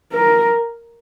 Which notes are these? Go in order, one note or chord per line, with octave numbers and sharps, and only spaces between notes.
A#4